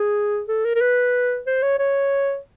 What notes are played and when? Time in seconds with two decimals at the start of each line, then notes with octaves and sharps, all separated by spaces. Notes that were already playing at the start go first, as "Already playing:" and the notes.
Already playing: G#4
0.48 A4
0.65 A#4
0.75 A#4
0.81 B4
1.47 C5
1.63 C#5
1.79 C#5